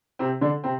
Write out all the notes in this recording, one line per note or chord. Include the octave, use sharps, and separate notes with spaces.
C3 C4
D3 D4
C3 C4